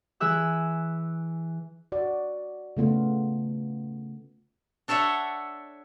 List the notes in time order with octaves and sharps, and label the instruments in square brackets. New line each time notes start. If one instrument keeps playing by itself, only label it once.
[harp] E3 G#4 E5 E6 F#6
[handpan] F#4 D5
C#3 A3 B3 F4
[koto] D4 A4 C#5 E5 F#5